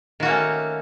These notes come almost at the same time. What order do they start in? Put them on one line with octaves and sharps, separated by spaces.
D#3 F#4 A#3 C#4 A3